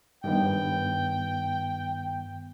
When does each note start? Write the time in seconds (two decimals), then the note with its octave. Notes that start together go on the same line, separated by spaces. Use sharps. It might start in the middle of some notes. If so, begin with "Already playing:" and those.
0.24 G2 D#3 B3 G5